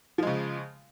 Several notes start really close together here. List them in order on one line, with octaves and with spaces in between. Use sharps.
F3 G#3 C#3